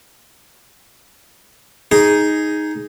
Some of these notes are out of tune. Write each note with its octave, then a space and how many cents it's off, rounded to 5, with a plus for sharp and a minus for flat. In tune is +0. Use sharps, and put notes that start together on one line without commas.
D#4 +5 G#4 +0